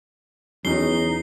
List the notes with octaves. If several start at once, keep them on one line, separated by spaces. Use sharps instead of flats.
E2 F#3 C#4 D#4 C7 G7